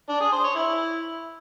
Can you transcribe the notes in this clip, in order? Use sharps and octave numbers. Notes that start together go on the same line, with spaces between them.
D4
G#4
C5
C#5
E4